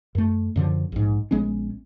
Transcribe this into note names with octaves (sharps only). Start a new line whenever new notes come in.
F#2 A3
F#2 D3 F3
A#1 G#2
A#1 G#3 B3 C#4